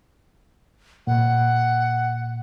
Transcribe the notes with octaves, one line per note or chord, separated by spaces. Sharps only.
A#2 F#5